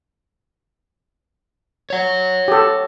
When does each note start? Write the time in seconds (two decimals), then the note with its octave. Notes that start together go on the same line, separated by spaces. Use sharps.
1.90 C#5 F#5
2.48 G4 A4